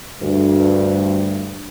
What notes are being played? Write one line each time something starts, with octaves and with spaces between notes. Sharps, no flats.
D2 G2